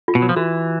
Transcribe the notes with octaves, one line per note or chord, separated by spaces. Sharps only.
F4
B2
F#3
F3
E3 F#4